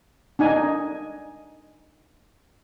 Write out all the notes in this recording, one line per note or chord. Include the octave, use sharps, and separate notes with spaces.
D4 D#4 G#5